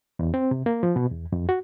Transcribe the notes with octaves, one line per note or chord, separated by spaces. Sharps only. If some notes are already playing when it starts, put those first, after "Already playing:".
E2
C4
C3
A#3
F3
B2
E2
F2
F#4